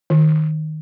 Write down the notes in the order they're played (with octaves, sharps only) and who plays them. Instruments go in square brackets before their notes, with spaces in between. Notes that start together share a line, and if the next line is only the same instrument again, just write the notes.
[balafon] D#3